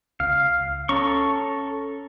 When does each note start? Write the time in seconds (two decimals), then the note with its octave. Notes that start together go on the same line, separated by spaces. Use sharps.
0.20 C#2 F5
0.89 C#4 A4 A#5 C#6